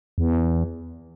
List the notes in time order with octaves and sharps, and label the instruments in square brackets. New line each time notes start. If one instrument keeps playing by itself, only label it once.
[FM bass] E2